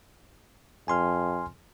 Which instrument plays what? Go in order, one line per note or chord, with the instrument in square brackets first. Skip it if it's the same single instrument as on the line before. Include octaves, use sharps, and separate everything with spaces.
[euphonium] F2 [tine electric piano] G#5 C6 F6